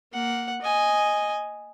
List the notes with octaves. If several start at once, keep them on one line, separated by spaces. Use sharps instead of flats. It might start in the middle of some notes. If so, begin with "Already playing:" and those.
A#3 F#5
D#5 G#5